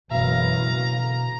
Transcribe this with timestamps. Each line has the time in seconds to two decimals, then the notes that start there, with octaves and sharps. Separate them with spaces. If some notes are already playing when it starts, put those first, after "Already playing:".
0.11 F#1 F#2 B2 E3 F5 A#5
0.92 D3